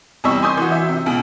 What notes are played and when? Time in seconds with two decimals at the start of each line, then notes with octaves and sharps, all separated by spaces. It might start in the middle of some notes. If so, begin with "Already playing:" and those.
0.24 E2 C3 G3 D#5 C#6 E6
0.42 G#5 C6 D6 D#6 G6
0.57 E3 F#4
0.72 E5
0.89 C3
1.06 C#2 B2